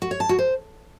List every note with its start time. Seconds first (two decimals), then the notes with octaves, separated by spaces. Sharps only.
0.02 F#4
0.11 C#5
0.20 A5
0.29 F#4
0.39 C5